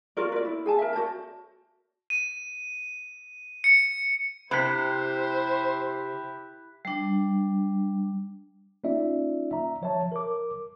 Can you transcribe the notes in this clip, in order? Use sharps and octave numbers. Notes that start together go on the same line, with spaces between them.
F4 F#4 A#4 D5
B4 D5
E4
G#4 G#5 A5
A#4 E5
F#4 C5 D5 A5
D#7
C#7
C3 E4 G4 C5 B5 F#6 B6
G3 D4
A#3 C#4 D#4 F4 D5 E5
E5 A#5
F3 C#5 E5 A5
A#4 D6